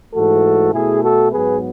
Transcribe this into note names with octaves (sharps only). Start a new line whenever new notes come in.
G#2 E3 A3 F#4 A4
B2 A3 E4 G#4
F#4 A4
G#2 F#3 B3 G#4 B4